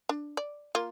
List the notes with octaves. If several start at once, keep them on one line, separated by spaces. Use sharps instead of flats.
D4
D5
A#3 F4